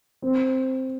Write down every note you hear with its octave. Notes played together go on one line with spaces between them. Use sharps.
C4